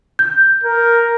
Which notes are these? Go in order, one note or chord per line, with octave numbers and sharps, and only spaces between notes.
G6
A#4